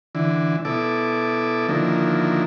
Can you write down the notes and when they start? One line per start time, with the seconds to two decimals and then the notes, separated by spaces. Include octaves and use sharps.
0.15 D3 E3
0.65 B2 E4 A4 D6
1.69 D3 D#3 F3 A#3 E4